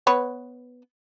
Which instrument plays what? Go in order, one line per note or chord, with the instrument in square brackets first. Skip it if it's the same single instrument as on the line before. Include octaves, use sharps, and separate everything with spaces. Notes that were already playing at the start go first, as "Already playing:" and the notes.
[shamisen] B3 B4 C#5